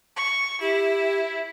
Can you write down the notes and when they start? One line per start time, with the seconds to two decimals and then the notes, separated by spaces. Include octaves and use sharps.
0.17 C#6
0.61 E4 G4